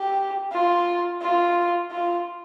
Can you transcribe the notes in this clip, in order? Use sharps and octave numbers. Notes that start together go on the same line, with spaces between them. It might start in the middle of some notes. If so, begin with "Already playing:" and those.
Already playing: G4
F4
F4
F4